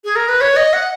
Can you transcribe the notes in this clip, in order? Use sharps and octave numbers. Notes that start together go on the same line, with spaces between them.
G#4
A#4
B4
C#5
D#5
F#5